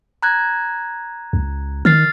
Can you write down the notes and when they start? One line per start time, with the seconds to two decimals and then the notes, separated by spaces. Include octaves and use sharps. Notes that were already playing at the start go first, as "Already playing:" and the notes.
0.23 A#5 F#6 G#6
1.33 C#2
1.85 D#3 F6 A6 C7